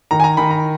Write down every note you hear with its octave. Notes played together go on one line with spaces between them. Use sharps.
D#3 A#5
G#5
A#5
D#3 B5
A#5